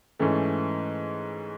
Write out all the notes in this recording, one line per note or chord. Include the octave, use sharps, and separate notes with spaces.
G#2 E3 A3 C#4